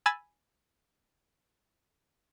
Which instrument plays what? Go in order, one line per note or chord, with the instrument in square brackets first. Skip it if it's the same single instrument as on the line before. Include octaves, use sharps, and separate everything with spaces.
[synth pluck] G#5 B5 E6 G#6 A6